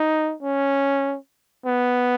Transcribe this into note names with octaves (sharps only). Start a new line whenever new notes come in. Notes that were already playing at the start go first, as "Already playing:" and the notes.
Already playing: D#4
C#4
B3